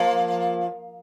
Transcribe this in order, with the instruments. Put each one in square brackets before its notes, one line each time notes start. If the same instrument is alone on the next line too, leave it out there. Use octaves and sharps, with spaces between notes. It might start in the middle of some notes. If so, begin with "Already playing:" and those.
Already playing: [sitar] F3 A#3